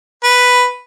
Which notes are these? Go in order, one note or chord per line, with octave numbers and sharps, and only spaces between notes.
B4